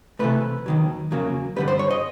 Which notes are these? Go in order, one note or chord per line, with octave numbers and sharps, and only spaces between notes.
C3 E3 A3 B4
D#2 D#3 F#3
E2 C#3 F#3 A#3
G2 D3 G3 B4
C5
C#5
D#5